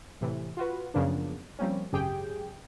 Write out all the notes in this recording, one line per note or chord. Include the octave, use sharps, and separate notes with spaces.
A2 C3 E3
F4 F#4 B4
F#2 C#3 F3 A#3 B3 D4
F3 G3 A#3 C4 C#4
G#1 F#2 C#3 G4 G#4 G5